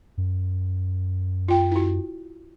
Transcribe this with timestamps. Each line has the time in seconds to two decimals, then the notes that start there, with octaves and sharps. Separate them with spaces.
0.18 F#2
1.48 F4 G5
1.71 E4 F#4